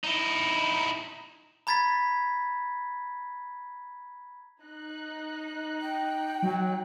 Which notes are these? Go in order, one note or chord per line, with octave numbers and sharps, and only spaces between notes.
D#4 E4
A#5 B5 G#6 A6 B6
D#4 F#6
G5
F#3